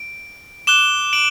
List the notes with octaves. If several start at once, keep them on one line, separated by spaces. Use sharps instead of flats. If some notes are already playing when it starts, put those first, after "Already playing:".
Already playing: D7
D6 F#6 E7 G7
D7 F#7